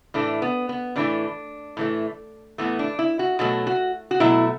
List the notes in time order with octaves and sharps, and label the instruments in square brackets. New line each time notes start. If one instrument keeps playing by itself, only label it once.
[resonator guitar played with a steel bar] A2 E3 A3 D4
B3
B3
A2 E3 A3 D4
A2 E3 A3
A2 E3 A3 B3
D4
E4
F#4
B2 F#3 A3 F#4
F#4
F#4
B2 F#3 A3 E4